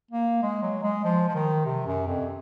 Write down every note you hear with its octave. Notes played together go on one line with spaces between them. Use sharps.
A#3
G#3
F#3
G#3
F3
F3
D#3
C3
F#2
F2